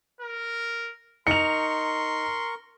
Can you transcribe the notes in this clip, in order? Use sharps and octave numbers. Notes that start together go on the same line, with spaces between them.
A#4
D#4 A#4 C6 C#6 C#7 F7